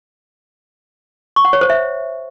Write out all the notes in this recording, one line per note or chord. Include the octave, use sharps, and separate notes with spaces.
C#6
F#5
C#5
C5
E5